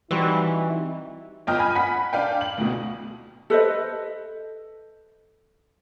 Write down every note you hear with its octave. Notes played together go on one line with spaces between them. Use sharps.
E3 G3 C4 D#4 E4 F#4
G1 F4 D#5 G5 F6
G#5 B5
F#5 B5 B6
D4 F5 G5
F#7
D2 B2
A4 B4 C5 D#5